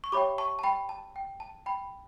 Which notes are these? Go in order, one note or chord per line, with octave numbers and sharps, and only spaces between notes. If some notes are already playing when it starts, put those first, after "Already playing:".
C#6
G4 C#5 E5 G5 B5 D6
A5 C#6
A5
G5 B5
A5
G5
A5
G5 B5